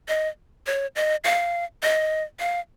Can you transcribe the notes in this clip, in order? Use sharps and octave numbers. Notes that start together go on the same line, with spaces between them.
D#5
C#5
D#5
F5
D#5
F5